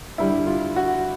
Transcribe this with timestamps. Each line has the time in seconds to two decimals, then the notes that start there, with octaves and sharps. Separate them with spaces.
0.18 G2 D3 G3 E4
0.47 F4
0.76 F#4